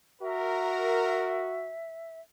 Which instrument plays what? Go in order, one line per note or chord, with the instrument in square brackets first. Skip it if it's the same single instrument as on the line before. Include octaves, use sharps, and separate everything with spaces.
[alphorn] F#4 [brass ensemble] A#4 [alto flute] E5